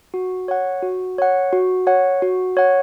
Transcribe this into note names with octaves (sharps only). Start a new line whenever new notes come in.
F#4
C#5 F#5
F#4
C#5 F#5
F#4
C#5 F#5
F#4
C#5 F#5